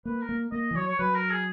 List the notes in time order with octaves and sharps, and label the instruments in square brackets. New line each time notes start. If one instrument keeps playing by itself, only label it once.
[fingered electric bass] A#3 [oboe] B4
[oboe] A#4
[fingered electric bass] A#3
[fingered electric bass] A#3 [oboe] D#5
[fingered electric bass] E3
[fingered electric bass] F#3 [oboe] C#5
[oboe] C#5
[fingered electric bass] F#3 [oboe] B4
[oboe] A#4
G#4